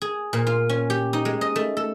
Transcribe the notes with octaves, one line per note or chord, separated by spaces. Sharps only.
G#4
A#2
F4
C#4
G4
D#4
G#3
D#5
A3
A4